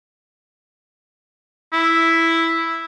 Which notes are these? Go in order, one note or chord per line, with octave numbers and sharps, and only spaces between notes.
E4